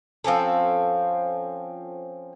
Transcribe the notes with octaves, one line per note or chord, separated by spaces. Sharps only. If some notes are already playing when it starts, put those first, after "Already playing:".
F3 C4 C#4 A4